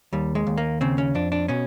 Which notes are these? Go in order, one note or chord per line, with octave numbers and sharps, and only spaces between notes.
D#2 G3
G#3
D#2
A#3
C#3 C4
C#4
F2 D4
D4
B2 C#4